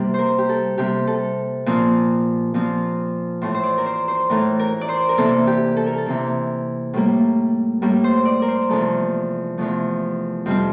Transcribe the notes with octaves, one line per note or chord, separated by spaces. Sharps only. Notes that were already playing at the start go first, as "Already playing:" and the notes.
Already playing: C3 G3 A#3
A#4 C5
G4
A4
C3 G3 A#3 G4
A4
A#2 F3 C4
A#2 F3 C4
A2 E3 A3 C5
C5
D5
A#4
C5
C5
A2 E3 A3 A#4
A#4
D5
C5
A#4
C3 E3 A#3 A4
G4
A4
A#4
A4
C3 E3 A#3
A2 G3 A#3
A2 G3 A#3
C5
D5
A#4
C5
E2 C3 F3 A3 A4
E2 C3 F3 A3
F2 C3 G3 C4